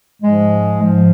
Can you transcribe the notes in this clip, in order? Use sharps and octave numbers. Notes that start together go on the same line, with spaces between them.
G#2 F3 G#3
G#2 F3